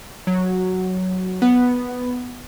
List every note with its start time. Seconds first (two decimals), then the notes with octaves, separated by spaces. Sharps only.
0.27 F#3
1.42 B3